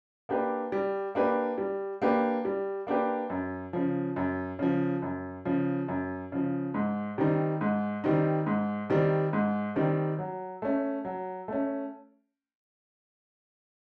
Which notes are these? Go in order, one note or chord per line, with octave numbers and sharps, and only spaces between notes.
A#3 D4 G4 B4
G3
A#3 D4 G4 B4
G3
A#3 D4 G4 B4
G3
A#3 D4 G4 B4
F#2
C#3 F3
F#2
C#3 F3
F#2
C#3 F3
F#2
C#3 F3
G#2
D#3 G3 C4 D#4
G#2
D#3 G3 C4 D#4
G#2
D#3 G3 C4 D#4
G#2
D#3 G3 C4 D#4
F#3
A3 C#4
F#3
A3 C#4